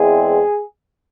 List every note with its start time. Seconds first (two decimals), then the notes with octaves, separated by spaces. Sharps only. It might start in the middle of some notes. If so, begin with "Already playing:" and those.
Already playing: E2 E3 G#3 C4 G#4